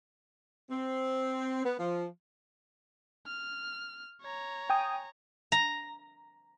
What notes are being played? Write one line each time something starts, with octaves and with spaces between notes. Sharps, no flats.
C4
B3
F3
F6
C#5 A#5
G5 G#5 D#6
A#5